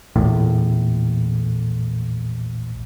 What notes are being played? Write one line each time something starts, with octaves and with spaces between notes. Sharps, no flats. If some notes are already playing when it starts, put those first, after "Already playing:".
A#1 E2 A2